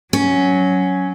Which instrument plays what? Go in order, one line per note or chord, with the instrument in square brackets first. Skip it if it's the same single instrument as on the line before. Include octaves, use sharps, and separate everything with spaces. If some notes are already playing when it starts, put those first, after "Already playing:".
[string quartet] F#3 [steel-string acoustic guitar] C#4